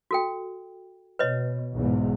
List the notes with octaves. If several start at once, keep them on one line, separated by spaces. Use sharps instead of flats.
F#4 A4 G5
B2 B4 C#5 D#5
B1 E2 G#2